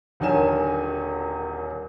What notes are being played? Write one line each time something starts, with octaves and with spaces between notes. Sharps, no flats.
D#1 D3 D#3 F#3 G#5 E7